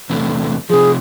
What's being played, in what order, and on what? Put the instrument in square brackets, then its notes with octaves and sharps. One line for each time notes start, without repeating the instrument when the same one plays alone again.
[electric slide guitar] E2 C3 A3
[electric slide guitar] C3 F3 [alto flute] G#4